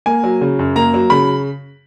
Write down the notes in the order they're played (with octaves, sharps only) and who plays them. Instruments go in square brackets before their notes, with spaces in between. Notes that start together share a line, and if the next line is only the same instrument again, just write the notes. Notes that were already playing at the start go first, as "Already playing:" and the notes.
[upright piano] A#3 G#5
F#3
C#3
F#2
A#3 A#5
F#3
C#3 B5